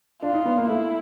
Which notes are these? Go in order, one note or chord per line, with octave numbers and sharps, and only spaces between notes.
D4 F4
D#4
B3
A#3
A3 E4